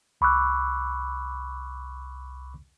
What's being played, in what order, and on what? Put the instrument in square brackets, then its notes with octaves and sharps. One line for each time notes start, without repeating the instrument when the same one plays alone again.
[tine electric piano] C2 B5 C#6 D6 E6 F#6